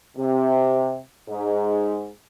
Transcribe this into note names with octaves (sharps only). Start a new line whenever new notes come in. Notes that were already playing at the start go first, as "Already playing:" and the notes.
C3
G#2